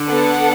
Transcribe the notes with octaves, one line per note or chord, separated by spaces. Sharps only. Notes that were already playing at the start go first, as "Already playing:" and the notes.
Already playing: D3
B3 D4 A4 F#5